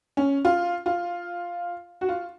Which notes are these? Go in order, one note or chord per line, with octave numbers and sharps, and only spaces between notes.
C#4
F4
F4
F#4
F4